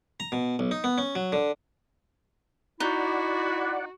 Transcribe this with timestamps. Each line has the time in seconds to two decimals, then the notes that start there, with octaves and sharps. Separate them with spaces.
0.20 A#5
0.32 B2
0.59 B1
0.71 D#4
0.84 B3
0.98 C#4
1.15 F#3
1.33 D3
2.80 D#4 E4 F#4 D5 F#5